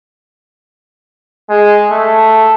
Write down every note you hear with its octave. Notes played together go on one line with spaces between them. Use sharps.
G#3
A3